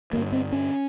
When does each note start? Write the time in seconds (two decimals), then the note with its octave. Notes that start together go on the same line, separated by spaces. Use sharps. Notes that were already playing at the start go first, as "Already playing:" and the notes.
0.13 D3 A#3
0.17 G2
0.32 C4
0.52 C#4